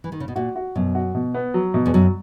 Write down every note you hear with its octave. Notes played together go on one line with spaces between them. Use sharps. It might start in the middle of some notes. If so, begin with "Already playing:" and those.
E3
D#3
C#3
B2
A#2 F#4
F#4
F#2 B2
F#4
B2
B3
F#3
B2
E2
F#2 F#3